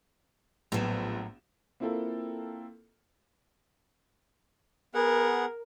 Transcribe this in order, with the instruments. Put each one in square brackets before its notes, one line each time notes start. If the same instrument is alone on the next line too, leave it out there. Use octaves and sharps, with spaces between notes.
[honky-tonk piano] A#1 B3 E7 [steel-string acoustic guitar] A2 F#3
[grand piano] A#3 C4 E4 F4 A4 A#4
[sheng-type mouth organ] B3 G#4 F#5 [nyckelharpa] A#4